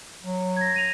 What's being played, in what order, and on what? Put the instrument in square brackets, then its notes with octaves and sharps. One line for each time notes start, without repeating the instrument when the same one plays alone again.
[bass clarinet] F#3
[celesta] G#6 A#6
A#6 D#7 F7